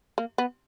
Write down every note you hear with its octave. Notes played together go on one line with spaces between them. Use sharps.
A#3
B3